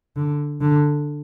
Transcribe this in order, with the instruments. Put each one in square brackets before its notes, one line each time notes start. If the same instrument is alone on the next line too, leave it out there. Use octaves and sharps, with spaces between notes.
[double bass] D3
D3